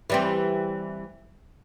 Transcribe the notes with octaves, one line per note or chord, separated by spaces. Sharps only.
E3 G3 C4